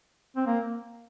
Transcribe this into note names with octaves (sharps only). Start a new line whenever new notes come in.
C4
A#3